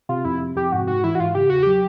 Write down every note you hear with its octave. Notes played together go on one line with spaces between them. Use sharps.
C3 F4
F2 E4
C3
F2 G4
G#2 F#4
G#2 F#4
E3 E4
F#4
G#2 F4
C#3 G4
E2 F#4
F#3 G4